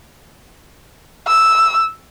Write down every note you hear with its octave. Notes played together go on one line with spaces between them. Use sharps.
E6